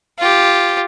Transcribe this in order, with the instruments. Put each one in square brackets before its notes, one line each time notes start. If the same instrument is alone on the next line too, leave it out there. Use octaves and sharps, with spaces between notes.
[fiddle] F4 G4